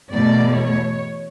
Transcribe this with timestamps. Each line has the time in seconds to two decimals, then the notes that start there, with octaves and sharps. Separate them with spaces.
0.11 E2 B2 A3 D5
0.56 C#5